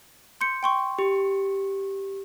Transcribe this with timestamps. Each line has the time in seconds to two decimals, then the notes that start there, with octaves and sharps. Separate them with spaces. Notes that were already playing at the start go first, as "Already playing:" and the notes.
0.41 C6 G6 C#7
0.63 G5 C6 C#6
0.99 G4